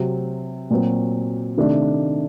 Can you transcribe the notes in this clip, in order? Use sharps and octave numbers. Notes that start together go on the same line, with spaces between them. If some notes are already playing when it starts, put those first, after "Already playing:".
Already playing: C3 F#3 C4
A#2 F#3 C4 F#4
C3 D#3 A3 D4